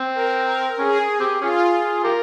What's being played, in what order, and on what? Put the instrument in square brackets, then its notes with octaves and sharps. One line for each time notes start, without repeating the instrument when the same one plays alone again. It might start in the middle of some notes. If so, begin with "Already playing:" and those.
Already playing: [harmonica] C4
[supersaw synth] A#4
A#4
[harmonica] C#4 [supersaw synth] G#4
[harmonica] G#4
C4 G4
[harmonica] C#4 G#4 [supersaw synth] F4
[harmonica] G4 A#4